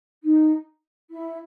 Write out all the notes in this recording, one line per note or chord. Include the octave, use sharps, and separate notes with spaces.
D#4
E4